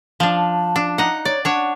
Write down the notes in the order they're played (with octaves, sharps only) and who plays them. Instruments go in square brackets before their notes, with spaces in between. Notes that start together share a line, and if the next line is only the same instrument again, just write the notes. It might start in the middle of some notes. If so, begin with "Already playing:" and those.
[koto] F3 D4
[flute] A5
[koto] D4
[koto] D#4 F#5 [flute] A#5
[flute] C#5 [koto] D5
[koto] D4 C#5 [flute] F#5